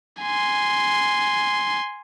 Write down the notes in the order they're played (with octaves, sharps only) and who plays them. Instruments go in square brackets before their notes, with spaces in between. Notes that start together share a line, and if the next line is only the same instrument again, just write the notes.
[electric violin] G#5 C6